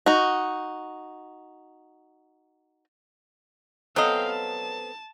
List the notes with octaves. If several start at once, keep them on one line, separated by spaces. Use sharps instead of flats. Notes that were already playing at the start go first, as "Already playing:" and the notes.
D#4 F#4
F#3 B3 C4 A4 D#5 F5 G5
A5